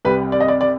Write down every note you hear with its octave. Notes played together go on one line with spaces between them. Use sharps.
C2 C3 G3 B4
D5
D#5
D5
D5